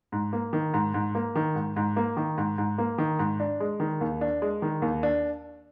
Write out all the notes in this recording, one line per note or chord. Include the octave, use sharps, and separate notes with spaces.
G#2
A#3
D#3
G#2
G#2
A#3
D#3
G#2
G#2
A#3
D#3
G#2
G#2
A#3
D#3
G#2
D4
G#3
D#3
D#2
D4
G#3
D#3
D#2
D4